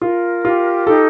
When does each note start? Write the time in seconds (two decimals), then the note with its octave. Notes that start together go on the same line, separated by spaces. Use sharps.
0.01 F4 A#4
0.44 F4 G4
0.87 D#4 A4